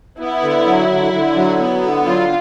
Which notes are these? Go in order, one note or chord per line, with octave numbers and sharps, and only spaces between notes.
B3 E4
D3
F#3
D3
D3
F#3
B3
D3
F#3 F4